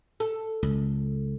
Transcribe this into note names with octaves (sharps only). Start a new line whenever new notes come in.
A4
C#2